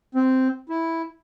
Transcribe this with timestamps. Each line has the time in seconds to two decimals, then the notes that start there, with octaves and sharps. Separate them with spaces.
0.15 C4
0.69 E4